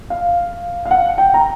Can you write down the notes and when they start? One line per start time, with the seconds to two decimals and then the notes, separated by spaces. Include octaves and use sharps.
0.10 F5
0.85 F5
0.91 F#5
1.18 G5
1.34 A#5